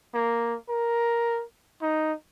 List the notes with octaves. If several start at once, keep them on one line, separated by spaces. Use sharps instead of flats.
A#3
A#4
D#4